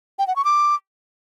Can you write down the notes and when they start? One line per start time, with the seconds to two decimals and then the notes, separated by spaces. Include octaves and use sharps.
0.19 G5
0.27 F#5
0.36 C#6
0.44 D6